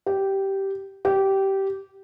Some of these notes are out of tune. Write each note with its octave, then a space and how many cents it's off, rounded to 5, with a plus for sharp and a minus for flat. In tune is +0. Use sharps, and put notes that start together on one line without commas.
G4 -10
G4 -15